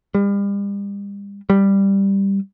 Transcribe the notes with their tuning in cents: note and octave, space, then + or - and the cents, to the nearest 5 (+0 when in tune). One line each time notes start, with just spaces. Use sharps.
G3 +40
G3 +5